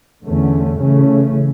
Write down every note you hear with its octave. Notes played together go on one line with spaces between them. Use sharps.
E2 D3 A3 C#4
C#3 E3 A3 C#4